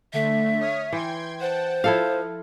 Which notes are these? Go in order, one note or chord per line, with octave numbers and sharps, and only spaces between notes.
D3 A3 E5
C#5 D#6 F6
E3 G5 C6 G#6
C5 F#5 G5 A5
F3 E4 A4 F5